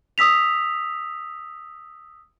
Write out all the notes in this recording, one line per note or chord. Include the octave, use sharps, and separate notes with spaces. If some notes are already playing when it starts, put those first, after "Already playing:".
D#6 E6 B6 F7